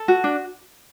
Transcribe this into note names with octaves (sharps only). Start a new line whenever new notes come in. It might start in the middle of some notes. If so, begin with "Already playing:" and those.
Already playing: A4
F#4
D4